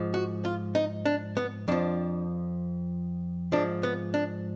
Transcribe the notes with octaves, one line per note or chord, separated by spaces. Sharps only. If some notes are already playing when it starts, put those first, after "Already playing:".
Already playing: G#2 F3
F#4
F4
D#4
D4
B3
F2 F3 D4
G#2 F3 D4
B3
D4